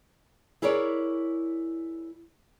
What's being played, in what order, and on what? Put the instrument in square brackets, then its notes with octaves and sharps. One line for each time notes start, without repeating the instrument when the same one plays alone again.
[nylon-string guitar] E4 G#4 A#4 C#5 D5